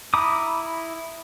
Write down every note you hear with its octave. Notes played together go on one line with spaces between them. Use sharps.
E4 A#5 B5 D6 D#6